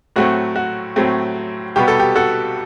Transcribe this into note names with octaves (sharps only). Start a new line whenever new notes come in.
A2 F#3 A3 C4 F#4
F#4
A2 F#3 A3 C4
C2 B2 G3 B3 G4
A4
G4
F#4 A4